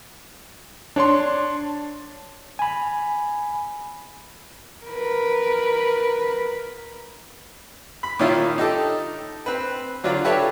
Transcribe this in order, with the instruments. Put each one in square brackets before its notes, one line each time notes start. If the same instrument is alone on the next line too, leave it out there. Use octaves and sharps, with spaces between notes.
[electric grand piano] D4 C#5 A5 C6
[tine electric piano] G#5 B5
[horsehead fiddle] A#4 B4
[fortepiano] B5
A#2 D#3 C#4 E4 F4
D#4 G4 A4
C4 B4
D3 F#3 D4 F4
G4 A4 B4 C#5 E5